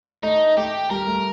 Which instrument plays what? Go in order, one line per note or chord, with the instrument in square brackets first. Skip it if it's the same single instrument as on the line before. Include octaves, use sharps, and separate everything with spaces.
[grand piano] A3 [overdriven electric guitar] D#4
[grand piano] A3 [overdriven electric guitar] G4
[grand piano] G3 [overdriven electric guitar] A#4
[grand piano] A3